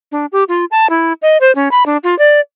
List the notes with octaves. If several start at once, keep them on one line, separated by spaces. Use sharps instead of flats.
D4
G4
F4
A5
E4
D#5
C5
C#4
B5
D4
F4
D5